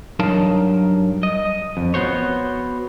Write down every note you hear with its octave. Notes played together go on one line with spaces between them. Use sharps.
G2 F#3 D#4 A#4 F5 A5
D#5
F2
B3 F#4 C5 C#5